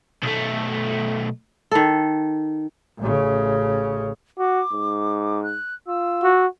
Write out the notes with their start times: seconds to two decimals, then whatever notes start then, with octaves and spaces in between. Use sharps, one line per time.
0.23 B1 A3
1.71 D#3 A4
2.98 A1 C#3
4.39 F#4 D6
4.72 G#2
5.43 F#6
5.87 F4 E6
6.23 F#4